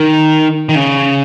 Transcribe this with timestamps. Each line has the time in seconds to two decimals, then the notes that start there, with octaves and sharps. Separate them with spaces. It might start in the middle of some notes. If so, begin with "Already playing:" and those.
Already playing: D#3
0.69 D#3
0.75 C#3